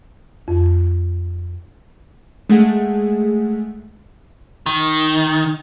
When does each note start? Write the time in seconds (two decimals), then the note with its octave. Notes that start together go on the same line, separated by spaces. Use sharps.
0.48 F2
2.49 G#3 A3 G#4 F#5
4.66 D#3